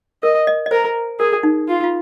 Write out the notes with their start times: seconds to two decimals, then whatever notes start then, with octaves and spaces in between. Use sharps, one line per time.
0.23 A#4 D#5
0.47 D#5
0.66 D#5
0.71 A#4 C5
1.19 G#4 A#4
1.43 D#4
1.68 F4
1.84 F4